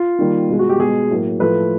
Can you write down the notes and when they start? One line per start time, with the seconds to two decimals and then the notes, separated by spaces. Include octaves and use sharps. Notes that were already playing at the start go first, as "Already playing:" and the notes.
Already playing: F4
0.19 D#3 G3 A#3
0.49 B2 G#3
0.59 F#4
0.69 G4
0.80 B2 G#3 G#4
1.10 A2 F#3 A#3
1.40 A2 F3 A3 B4